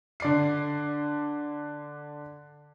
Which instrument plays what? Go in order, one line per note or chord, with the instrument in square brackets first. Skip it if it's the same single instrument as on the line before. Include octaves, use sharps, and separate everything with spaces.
[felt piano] D3 D5 C7